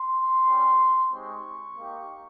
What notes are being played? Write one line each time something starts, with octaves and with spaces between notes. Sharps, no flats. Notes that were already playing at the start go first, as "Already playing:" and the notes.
Already playing: C6
G3 C#4 G4
G#3 C4 D#4 G4 C#6
A#3 D#4 G4